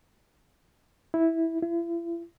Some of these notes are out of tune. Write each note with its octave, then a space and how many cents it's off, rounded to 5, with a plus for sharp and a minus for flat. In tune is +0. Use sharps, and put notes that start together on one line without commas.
E4 -10
E4 +40